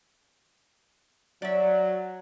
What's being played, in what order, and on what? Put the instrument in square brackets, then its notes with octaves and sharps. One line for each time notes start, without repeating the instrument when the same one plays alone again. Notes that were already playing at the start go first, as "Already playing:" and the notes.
[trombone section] F#3 [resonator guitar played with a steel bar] D5 E5